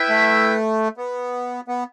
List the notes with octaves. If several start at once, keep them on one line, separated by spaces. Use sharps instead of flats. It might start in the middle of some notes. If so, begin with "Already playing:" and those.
Already playing: E4 B4 E5 G5
A3
B3
B3